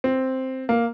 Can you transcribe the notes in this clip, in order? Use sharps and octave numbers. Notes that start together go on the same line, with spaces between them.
C4
A#3